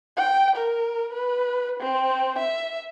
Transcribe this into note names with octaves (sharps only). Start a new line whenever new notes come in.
G5
A#4
B4
C4
E5